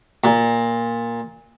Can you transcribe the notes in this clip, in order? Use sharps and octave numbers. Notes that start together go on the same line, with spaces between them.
A#2